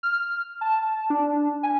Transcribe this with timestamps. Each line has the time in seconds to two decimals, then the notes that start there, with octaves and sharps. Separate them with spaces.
0.03 F6
0.61 A5
1.10 D4
1.63 G#5